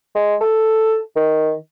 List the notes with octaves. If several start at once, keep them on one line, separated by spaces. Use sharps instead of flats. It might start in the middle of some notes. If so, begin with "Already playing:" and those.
G#3
A4
D#3